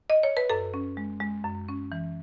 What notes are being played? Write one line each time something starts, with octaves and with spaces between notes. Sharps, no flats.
D#5
C#5
B4
F#2 A4
C#4
G#3
G#3
F#2
C#4
E3